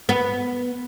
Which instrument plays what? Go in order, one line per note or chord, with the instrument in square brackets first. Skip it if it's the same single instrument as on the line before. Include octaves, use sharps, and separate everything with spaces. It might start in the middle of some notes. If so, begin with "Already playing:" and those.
[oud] B3